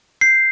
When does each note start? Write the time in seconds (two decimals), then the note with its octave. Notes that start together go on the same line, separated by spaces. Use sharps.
0.21 G6 C7